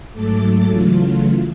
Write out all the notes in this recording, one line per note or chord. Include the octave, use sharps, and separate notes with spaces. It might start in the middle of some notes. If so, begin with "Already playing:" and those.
G#2 F#3 A3 A4 D6 A6
C#3 E3 F#3 A3 F4